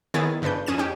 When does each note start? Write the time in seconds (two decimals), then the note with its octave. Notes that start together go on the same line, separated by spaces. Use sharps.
0.14 D#3 B3 E4 G#4 C#5 A6
0.42 G1 C#3 D4 B4 G6
0.66 F2 C#4 G#4 D#7 E7
0.78 C#4 D#4 G4